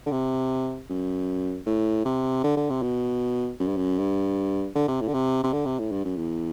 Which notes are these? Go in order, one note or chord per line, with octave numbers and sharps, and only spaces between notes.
D3
C3
F#2
A2
C3
D3
D3
C3
B2
F#2
G2
F#2
G2
D3
C3
A2
D3
C3
C3
D3
C3
A2
G2
F#2
E2